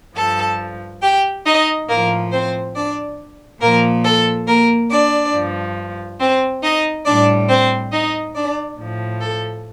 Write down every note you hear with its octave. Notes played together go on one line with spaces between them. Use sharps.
G2 F3 A4 A5
G4 G5
D#4 D#5
A2 F3 A#3 A#4
C4 C5
D4 D5
A#2 F3 A#3 A#4
A4
A#3 A#4
D4 D5
G2 F3
C4 C5
D#4 D#5
A2 G3 D4 D5
C4 C5
D#4 D#5
D4 D5
A2 F3
A4